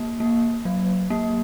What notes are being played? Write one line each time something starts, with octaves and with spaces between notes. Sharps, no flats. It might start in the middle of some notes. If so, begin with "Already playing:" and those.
Already playing: A#3
A#3
F#3
A#3